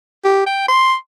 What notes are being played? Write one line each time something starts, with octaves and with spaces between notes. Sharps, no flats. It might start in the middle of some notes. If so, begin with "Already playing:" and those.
G4
G5
C6